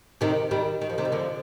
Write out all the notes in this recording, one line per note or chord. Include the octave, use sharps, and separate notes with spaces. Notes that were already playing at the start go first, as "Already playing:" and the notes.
C3 D#3
D#3 G3
D#3
F3
C3 D#3
G3
D3 F3